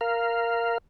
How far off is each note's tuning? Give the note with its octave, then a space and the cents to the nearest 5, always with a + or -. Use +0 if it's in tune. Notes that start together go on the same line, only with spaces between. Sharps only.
A#4 +0 F5 -10